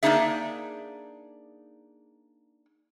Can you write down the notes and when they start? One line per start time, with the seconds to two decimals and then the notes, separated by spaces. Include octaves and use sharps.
0.03 A#3 B3 D4 D#4 G#4 E5